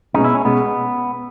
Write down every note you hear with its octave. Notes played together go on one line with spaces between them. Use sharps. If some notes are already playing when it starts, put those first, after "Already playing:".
B2 G#3 C#4 D#4
E4
C#4
B2 G#3 B3 C#4